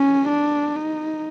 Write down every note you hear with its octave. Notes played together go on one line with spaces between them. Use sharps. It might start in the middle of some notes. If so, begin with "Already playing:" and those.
Already playing: C#4
D4
D#4